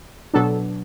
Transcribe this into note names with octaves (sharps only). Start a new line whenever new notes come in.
B2 F#3 B3 D4 A4